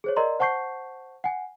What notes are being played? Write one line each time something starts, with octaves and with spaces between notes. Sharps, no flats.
G#4 C5 C#5
A#4 D5 D#5 A#5 C6
C5 F#5 A5 C#6 G6 C7
F#5 G#5